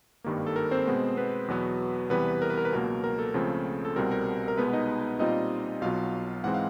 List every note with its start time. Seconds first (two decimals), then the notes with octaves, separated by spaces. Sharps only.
0.24 G#1 G2 D#3 G3 A#3
0.47 A4
0.56 A#4
0.71 C4 C5
0.87 B2 G#3 B3
1.17 B3 B4
1.48 E2 B2 F#3 B3
2.10 E2 C3 E3 G3 B3 B4
2.42 A#4
2.50 B4
2.58 A#4
2.65 B4
2.73 C#2 B2 F#3 A#3 A#4
3.04 A#4
3.19 A4
3.34 C#2 C#3 F3 A3 C4
3.85 A4
3.96 C2 B2 G3 C4 A#4
4.11 A#4
4.48 A#4
4.58 C2 B2 G#3 B3 B4
4.73 D#4 D#5
5.19 A#2 G3 C4 D#4 F4 D#5
5.81 B1 B2 F#3 F4 F5
6.44 G#2 E3 G#3 C4 F#5
6.54 F5